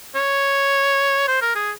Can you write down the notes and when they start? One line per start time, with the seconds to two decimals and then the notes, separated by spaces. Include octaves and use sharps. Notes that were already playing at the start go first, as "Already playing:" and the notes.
0.15 C#5
1.28 C5
1.42 A#4
1.55 G#4